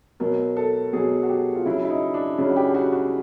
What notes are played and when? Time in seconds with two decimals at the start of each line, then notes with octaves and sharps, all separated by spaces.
0.20 B2 F#3 A#4
0.57 A4
0.93 B2 F#3 G#4
1.23 F#4
1.29 G4
1.55 F4
1.65 C#3 F#3 E4
1.84 E4
1.90 D#4
2.14 D4
2.38 C#3 F#3 C#4
2.50 F#4
2.56 G4
2.69 G4
2.75 F#4
2.93 F#4